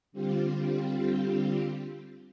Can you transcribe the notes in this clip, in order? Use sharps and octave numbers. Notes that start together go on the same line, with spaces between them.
D3 G3 C4 F4 G4